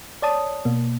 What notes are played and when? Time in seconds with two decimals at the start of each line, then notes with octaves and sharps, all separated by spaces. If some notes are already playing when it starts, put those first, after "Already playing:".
0.22 C#5 D5 A5 D#6
0.65 B2 A#3